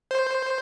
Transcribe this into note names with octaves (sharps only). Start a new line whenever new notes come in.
C5